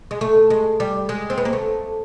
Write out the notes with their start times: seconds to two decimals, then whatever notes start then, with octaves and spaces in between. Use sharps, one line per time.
0.11 G#3
0.21 A3
0.50 G#3
0.80 G3
1.09 G#3
1.30 C4
1.38 B3
1.45 A#3
1.53 A3